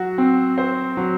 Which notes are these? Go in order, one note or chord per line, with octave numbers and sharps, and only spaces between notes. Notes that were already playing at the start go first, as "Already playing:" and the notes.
Already playing: F#3 F#4
C4
C5
F#3